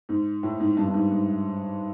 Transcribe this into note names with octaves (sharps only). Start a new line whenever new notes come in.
G#2
A2
G#2
G2
G2
G#2
G#2